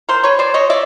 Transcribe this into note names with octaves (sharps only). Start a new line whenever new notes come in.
A#4 C5
B4 C#5
C5 D5
C#5 D#5
D5 E5